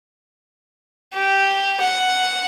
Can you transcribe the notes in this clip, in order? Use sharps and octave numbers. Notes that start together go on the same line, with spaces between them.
G4
F#5